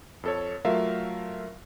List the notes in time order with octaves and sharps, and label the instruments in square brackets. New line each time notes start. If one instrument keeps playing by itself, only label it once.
[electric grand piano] F2 A4 C#5
F#3 A3 F4 A#4 E5 F5